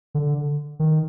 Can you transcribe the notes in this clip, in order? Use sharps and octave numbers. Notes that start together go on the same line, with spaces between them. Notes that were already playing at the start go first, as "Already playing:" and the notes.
D3
D#3